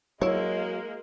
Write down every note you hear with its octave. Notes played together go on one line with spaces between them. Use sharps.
F#3 G#3 A#3 E4 C#5